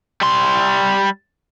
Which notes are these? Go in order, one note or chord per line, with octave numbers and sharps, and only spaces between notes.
G3 C6